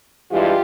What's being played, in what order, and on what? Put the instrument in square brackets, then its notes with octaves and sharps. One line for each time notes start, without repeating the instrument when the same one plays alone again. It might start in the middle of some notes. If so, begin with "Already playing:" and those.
[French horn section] G2 E3 G#3 F4 G4